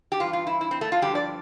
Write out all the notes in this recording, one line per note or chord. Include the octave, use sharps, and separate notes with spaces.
G4
G2 E3 F4
F4
E4
E4
C4
A3
F4
G2 D3 F3 G4
D5